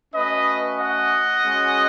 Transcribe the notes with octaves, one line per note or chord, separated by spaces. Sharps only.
A3 C#4 F#4 B4 D#5
D#5 F#5
G#3 C#4 F#4